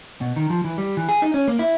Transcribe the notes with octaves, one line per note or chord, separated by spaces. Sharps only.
B2
D#3
F3
E3
G3
E3
G#4
D#4
C#4
A#3
E4